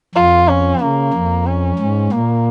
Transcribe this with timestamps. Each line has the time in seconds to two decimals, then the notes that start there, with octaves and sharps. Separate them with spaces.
0.15 F2 F4
0.48 C#4
0.81 C#3 A#3
1.14 F2
1.47 C#4
1.79 G#2
2.12 A#2 A#3